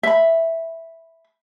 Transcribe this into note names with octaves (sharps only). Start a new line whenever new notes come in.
E5 B5